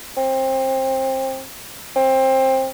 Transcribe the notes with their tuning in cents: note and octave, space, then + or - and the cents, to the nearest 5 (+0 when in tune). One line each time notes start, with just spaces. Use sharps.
C4 +25
C4 +20